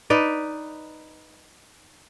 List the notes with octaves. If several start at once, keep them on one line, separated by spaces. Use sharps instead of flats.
D#4 B4 D5